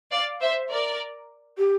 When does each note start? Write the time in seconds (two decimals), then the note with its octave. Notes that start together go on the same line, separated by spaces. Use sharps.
0.12 D5 F5
0.41 C5 E5
0.70 A#4 D5
1.58 G4